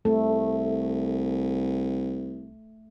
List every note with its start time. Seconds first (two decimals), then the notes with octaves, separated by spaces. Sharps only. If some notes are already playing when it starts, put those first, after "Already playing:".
0.05 C2 A3 A4